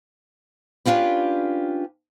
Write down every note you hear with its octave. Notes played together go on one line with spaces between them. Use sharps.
C#4 D4 F4 G4 B4